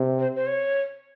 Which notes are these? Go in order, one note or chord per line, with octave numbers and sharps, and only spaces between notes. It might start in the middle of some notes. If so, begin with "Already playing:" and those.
Already playing: C3
C5
C5
C#5